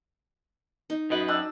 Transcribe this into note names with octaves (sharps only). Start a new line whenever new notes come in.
D#4
F#2 F#4 B4 D#5
D4 G5 E6